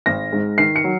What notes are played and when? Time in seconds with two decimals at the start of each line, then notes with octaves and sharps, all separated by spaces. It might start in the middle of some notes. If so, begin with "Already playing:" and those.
0.06 G#1 A#6
0.32 G#2
0.58 D#3 C7
0.76 C#7
0.84 F#3